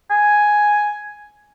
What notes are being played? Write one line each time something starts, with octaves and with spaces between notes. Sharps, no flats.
G#5